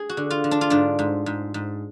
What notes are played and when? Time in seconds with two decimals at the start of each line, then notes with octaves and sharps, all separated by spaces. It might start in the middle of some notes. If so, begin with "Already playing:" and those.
Already playing: G#4
0.09 F#4
0.17 D3
0.30 F4
0.44 D3
0.51 D4
0.61 F4
0.70 G#2 D4
0.99 G#2
1.26 G#2
1.54 G#2